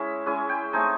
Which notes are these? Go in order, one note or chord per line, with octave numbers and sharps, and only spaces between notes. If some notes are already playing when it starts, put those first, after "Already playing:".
Already playing: G#3 C#4 E4 E5
G#3 C#4 E4 G#5
G5
A3 C4 D#4 G#5